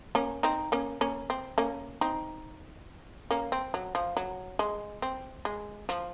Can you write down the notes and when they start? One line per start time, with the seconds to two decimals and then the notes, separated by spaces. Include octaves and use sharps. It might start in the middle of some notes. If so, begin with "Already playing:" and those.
0.15 A#3 C#4
0.43 C4 D#4
0.72 A#3 C#4
1.01 A#3 C#4
1.30 C4
1.58 A#3 C#4
2.01 C4 D#4
3.31 A#3 C#4
3.52 C4
3.74 F#3
3.95 F3
4.17 F#3
4.59 G#3
5.02 C4
5.45 G#3
5.89 F3